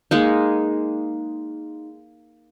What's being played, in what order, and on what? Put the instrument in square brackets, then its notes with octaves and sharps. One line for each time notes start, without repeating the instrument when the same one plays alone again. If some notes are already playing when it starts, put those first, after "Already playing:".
[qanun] G#3 A#3 D#4